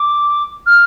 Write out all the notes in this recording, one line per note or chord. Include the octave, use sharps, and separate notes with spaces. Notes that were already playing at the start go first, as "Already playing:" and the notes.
Already playing: D6
F6